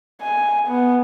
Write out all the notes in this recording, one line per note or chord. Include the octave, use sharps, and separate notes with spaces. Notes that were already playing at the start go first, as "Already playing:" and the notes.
G#5
B3